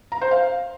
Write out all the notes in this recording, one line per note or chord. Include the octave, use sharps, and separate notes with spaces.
A#5
C5
F5